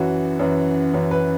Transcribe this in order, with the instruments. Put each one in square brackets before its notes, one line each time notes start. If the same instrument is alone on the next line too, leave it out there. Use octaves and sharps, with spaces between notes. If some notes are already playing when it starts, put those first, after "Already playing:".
Already playing: [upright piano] F#2 E3 F#4
F#2 E3
F#2 E3
B4